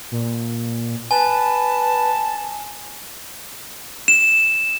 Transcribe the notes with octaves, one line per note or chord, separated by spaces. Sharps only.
A#2
B4 G#5 A5
E7